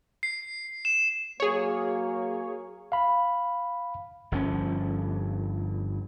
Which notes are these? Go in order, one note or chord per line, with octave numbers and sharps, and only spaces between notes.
C7
E7
F#3 A#3 G#4 C#5
F5 B5
G1 F3 C#4